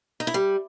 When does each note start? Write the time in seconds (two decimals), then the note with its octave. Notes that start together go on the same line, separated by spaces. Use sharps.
0.20 D#4
0.27 E4
0.34 G3